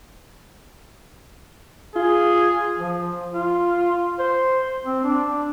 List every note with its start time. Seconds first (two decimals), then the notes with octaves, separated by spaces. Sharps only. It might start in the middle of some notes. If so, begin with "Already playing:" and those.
1.96 F4 G#4
2.78 F3
3.33 F4
4.19 C5
4.85 C4
5.04 D4